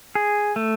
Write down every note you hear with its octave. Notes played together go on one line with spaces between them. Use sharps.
G#4
A3